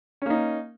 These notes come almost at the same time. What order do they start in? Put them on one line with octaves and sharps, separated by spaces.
C#4 A#3 D#4